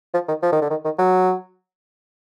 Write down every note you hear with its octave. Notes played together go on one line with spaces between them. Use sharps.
F3
D#3
F3
D#3
D3
D#3
D#3
F#3